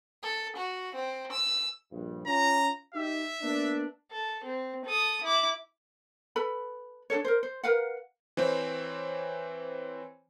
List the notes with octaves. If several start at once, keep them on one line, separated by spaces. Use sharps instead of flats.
A4
F#4
C4
E6
A#1 G2
C#4 F4 A#5
D#4 G4 E5
A#3 B3 D4
A4
C4
A4 D#6
E4 D6
A4 B4 B5
D4 D#4 A4 C#5
A#4 C5
C5
A#4 B4 F5 F#5
E3 C4 C5 C#5